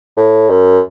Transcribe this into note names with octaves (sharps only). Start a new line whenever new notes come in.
A2
F#2